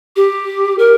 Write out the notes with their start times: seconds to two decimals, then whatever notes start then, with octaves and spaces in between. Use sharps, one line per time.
0.16 G4
0.78 A#4